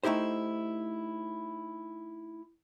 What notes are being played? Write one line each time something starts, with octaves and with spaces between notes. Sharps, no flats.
A3 D#4 E4 G4 C5